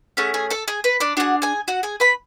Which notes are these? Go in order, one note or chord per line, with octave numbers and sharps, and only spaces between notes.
A3 C#4 G#4 F#5
G#4 G#5
A4 A5
G#4 G#5
B4 B5
D4 D5
D4 F4 F#4 G#4 F#5
G#4 G#5
F#4 F#5
G#4 G#5
B4 B5